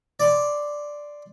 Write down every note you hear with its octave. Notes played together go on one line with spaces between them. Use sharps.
D5 C6